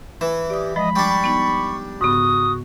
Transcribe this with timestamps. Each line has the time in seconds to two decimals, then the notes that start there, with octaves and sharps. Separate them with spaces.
0.21 E3 E5
0.50 G4 D5 D#6
0.76 F3 G#3 D#5 B5
0.96 G3 D4 C#6
1.24 B3 D#4
2.01 G#2 C#3 B3 F#4 D#6